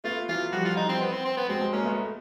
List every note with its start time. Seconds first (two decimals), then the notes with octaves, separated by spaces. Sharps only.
0.04 A3 B3 F4
0.28 E3 F#3 F4
0.52 F3 G3 F#4
0.65 F4
0.77 D#4
0.89 C4
1.01 B3
1.12 C4
1.25 C4
1.37 B3
1.49 F#3 G#3 C4
1.61 F#3 G#3
1.72 G#3 A#3 C#4
1.85 A3 B3